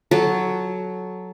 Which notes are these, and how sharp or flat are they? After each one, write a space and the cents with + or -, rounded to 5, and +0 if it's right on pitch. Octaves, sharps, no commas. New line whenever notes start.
F#3 +0 A4 -20